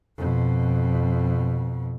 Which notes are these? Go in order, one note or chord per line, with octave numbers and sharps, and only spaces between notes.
F2 B2